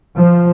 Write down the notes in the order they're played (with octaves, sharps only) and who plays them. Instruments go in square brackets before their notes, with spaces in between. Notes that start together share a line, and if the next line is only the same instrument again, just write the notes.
[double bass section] F3